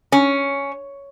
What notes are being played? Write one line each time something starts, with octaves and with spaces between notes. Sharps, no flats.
C#4